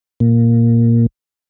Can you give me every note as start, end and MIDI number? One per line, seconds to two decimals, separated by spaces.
0.20 1.06 46